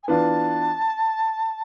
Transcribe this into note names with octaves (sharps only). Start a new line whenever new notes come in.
G#5
E3 B3 D4 F4 A5